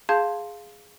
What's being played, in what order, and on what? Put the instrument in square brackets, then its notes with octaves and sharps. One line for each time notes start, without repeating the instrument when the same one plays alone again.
[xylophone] G#4 F5 A5 C6 G6 G#6